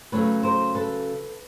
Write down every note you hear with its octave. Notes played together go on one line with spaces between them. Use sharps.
D#2 C#3 F#3 A3 C#4 B4 C#5
A#4 C5
A4 B4